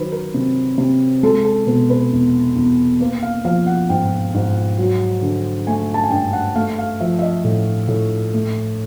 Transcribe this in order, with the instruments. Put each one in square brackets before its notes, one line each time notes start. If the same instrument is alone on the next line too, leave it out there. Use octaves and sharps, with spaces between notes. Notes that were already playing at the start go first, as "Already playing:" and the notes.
Already playing: [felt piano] D#3 F#3 B4 C5
A#4
C3
C3
G#3 A4
A4
B2 B4
B4
E2
E2
A#3 B4
F5
F3 F5
F#5
G#2 G5
G#2
F#3
D3
A3 G#5
A5
G#5
G2 G5
F#5
A3 F5
F5
F3 E5
E5
D#5
A2
A2
A3